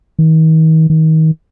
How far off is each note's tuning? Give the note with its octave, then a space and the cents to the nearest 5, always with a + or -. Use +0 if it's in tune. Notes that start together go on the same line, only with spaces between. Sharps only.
D#3 +40
D#3 +30